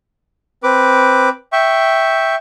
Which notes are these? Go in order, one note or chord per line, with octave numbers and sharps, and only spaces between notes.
C4 B4 D6
E5 G5 C#6